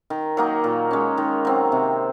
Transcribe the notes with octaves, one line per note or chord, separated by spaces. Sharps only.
D#3
F#3 A#3 D#4
A#2
G#3 C#4
D#3
F#3 C4
C3